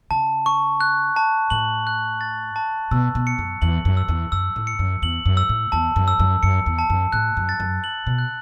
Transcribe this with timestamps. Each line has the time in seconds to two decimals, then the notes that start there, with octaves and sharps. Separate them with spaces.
0.11 C#3 A5
0.46 C#6
0.81 F#6
1.16 A5
1.50 A2 F#7
1.87 F#6
2.21 A6
2.56 A5
2.91 B2 E6
3.15 B2
3.27 C#7
3.38 F#2
3.62 E2 F#7
3.85 F#2
3.97 E6
4.08 E2
4.32 F#2 E6
4.56 A2
4.67 C#7
4.79 F#2
5.02 E2 F#7
5.25 F#2
5.37 E6
5.49 A2
5.72 E2 A5
5.96 F#2
6.08 E6
6.19 F#2
6.43 F#2 C#7
6.66 E2
6.79 A5
6.90 F#2
7.12 A2 F#6
7.37 F#2
7.49 A6
7.60 F#2
7.84 F#7
8.07 B2
8.18 F#6